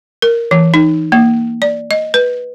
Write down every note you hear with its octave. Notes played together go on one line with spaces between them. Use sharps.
A#4
E3
D#4
A#3
D5
D#5
B4